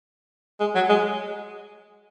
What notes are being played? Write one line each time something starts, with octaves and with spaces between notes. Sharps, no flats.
G#3
F#3
G#3